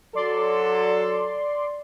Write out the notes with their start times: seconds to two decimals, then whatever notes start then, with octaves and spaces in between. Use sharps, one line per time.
0.15 F#3 A4 D5 C6